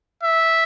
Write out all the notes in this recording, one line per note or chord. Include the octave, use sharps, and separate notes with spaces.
E5